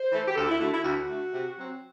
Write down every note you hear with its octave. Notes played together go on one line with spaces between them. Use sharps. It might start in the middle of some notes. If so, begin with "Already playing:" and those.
Already playing: C5
E3 A3
G4
D2 A4
E4
D3 A3 F#4
E4
D2 F#4
D3 A3
C3
F#3 C4